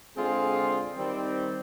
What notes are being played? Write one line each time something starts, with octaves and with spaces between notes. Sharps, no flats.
D3 G#3 C4 F4 G#4
D#3 G3 C4